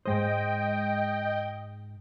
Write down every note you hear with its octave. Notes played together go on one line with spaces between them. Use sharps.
G#2 G#3 C5 D#5 G5